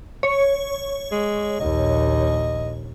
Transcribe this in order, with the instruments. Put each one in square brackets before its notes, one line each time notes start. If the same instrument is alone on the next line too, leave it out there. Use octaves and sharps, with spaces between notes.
[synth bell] C#5
[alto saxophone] G#3
[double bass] A#1 D#2 [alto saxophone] D#5